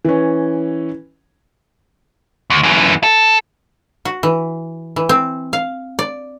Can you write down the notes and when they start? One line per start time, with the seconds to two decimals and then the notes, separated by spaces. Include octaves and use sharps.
0.05 E3 C#4
2.50 D2
2.63 F#2 E3
3.03 A4
4.05 F#4
4.23 E3
4.96 E3
5.09 C4
5.53 F5
5.99 D5